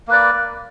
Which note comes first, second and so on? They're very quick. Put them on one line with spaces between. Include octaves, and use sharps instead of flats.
A#3 B4 D5